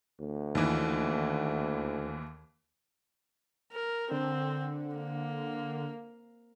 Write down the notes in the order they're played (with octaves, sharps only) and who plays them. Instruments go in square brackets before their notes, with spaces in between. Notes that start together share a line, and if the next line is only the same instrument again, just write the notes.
[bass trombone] D2
[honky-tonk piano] D#2 E3
[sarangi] A#4
[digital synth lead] D3 [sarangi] C4
[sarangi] A#3